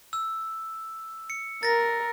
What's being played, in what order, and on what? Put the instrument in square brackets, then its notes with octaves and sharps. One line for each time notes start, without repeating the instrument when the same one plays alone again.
[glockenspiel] E6
C#7
[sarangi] A#4 [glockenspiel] A6 A#6